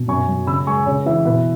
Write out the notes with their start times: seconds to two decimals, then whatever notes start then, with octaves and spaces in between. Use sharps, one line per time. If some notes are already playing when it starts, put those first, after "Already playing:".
Already playing: B2
0.08 F#2 G#5 C#6
0.28 F#3
0.47 C#3 B5 E6
0.66 G#3 G#5 C#6
0.86 C#3 C#5
1.06 E3 B4 E5
1.25 B2 B4 E5